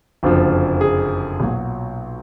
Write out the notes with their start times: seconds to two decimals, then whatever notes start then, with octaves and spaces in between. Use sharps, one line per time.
0.23 F#1 F2 D3 F3
0.81 G#4
1.40 B1 A#2 F#3